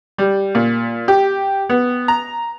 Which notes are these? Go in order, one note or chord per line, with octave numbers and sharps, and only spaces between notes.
G3
A#2
G4
B3
A#5